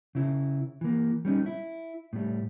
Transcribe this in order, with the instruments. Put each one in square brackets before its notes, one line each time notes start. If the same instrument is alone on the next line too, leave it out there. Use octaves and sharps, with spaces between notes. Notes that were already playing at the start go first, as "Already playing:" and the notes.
[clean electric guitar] C#3 E4
E3 A#3
G3 C#4 D#4
E4
A2 G3